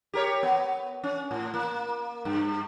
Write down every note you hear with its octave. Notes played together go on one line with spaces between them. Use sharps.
G4 A#4 C#5
B3
C#4
A2
A#3
G2